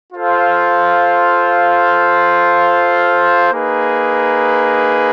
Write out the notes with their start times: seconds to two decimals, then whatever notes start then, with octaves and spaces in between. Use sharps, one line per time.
0.13 F4 A4 C5 F5
3.52 A#3 D#4 G#4 B4